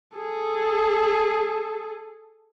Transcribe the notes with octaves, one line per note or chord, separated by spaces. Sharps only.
G#4 A4